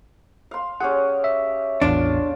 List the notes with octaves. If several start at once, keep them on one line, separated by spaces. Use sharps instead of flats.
F5 C6
C#4 G4 G#4 F#5
E5
A1 E2 D4 F4